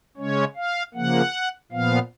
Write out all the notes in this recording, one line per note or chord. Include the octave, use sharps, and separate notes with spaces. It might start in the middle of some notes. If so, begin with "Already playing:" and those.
C#3 G#3 C#4 C#5
F5
C#3 F3 A#3 F#5
A#2 F3 B3 F5